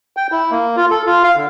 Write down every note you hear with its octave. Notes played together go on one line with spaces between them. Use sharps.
G5
E4
A#3
F4
A4
F4
F5
D3